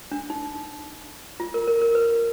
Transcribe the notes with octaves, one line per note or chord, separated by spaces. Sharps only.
D4
D#4
F4
A#4
A#4
A#4
B4